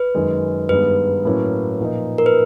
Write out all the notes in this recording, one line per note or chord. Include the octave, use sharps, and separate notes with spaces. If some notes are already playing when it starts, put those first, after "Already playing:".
Already playing: B4
F#2 D#3 G#3
G2 D#3 G#3 B3 D#4 B4
A2 F#3 A#3 C#4
A#2 F3 A#3 D#4
A#4
B4